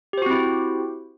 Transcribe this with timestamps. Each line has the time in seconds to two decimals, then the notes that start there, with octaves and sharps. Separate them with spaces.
0.13 G4
0.18 C5
0.22 F#4
0.26 C4
0.31 E4